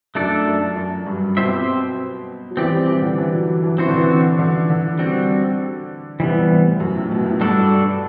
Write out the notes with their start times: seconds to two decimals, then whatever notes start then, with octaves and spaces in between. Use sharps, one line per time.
0.15 F#2 A3 D4 A4 D5
0.47 F#2
0.76 F#2
1.06 G2
1.37 B2 C4 G4 C5 E5
2.51 F#3
2.57 E3 C4 G4 D5
2.72 G3
2.88 E3
3.02 D3
3.18 E3
3.32 F#3
3.48 F#3
3.63 E3
3.78 E3 C4 F#4 C5
3.88 D3
3.98 E3
4.39 D3
4.70 D3
4.99 G3 C4 F#4
6.20 C3 E3 G3 B3
6.51 A2
6.80 F#2
6.95 A2
7.11 B2
7.26 A2
7.41 G2 D4 F#4 A4 D5